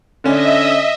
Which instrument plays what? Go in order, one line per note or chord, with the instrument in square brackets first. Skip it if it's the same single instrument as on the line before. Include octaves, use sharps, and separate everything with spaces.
[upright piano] D3 C#4 D4 [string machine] D#5 E5